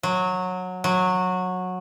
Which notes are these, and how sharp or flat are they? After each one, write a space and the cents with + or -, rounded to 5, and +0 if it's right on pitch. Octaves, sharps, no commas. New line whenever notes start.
F#3 -15
F#3 -15